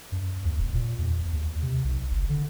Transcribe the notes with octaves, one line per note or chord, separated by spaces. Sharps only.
F#2
D#2
E1
A#2
E2
D#2
C3
B1
F#1
D3